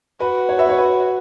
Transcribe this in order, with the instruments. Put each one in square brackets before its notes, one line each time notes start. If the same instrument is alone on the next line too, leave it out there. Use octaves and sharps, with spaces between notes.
[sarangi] F#4 [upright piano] B4
[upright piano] C#5
B4 E5
C#5
B4